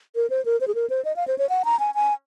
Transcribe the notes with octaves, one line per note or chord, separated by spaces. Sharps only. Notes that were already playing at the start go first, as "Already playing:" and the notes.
A#4
C5
A#4
C5
G#4
A#4
C5
D#5
F5
C5
C#5
F#5
A#5
G#5
G#5